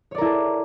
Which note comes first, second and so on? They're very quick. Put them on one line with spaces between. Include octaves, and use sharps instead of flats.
C#5 D5 A#4 E4 A4